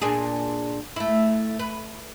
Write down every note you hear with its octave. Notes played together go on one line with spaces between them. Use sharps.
A#2 D4 G#4
A3 E4
B4